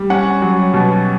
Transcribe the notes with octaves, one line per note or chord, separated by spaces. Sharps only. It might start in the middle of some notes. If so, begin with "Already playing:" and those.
Already playing: G3
C#4 F#5
F#3
B2